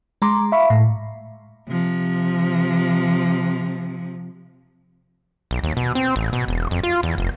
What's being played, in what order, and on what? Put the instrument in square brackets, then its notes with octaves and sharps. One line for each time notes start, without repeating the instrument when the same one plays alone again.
[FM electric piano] G#3 A#5 C6 D6
E5 F5 B5 C#6
A2
[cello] C3 F3
[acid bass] B1
D#2
B2
C4
A1
B2
E1
F2
F4
E2
F1